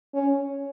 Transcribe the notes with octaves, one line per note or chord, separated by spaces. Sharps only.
C#4